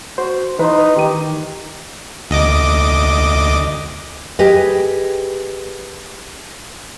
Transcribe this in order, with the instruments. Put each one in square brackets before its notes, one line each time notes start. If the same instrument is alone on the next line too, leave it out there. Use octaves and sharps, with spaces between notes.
[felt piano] F#4 [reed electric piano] C5
[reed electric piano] E3 [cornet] D#4 [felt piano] B4 C6
[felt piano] D#3 D#7 [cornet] G4
[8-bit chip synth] D2 D#5 D6
[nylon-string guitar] G4 G#4 B4 D#5